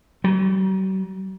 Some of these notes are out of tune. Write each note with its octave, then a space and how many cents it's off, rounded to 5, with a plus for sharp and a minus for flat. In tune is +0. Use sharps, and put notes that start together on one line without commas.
F#3 +45